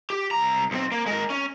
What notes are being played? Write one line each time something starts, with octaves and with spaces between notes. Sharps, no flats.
G4
C2 A#5
B1 C4
A#3
G#3 A#4
C#4